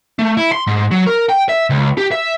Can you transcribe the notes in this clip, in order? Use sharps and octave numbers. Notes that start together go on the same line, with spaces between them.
A3
E4
C6
G#2
F#3
A#4
G5
E5
C#2
G4
E5